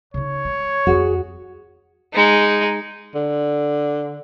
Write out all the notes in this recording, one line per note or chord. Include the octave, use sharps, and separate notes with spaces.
C#3 D#4 C#5
G#3
F2 G#3 F#4 G#4
G#3 D#4
D3